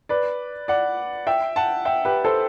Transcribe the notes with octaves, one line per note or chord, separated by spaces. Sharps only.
B4 D5
D5 F#5
E5 G5
F#5 A5
E5 G5
G4 B4
A4 C5